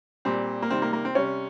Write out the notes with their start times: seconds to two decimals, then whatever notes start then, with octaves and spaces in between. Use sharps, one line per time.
0.25 A#2 G3 C4
0.62 A#3
0.70 C3 D#3 G3 C4
0.82 A#3
0.93 A#3
1.05 C4
1.15 C3 G3 C#4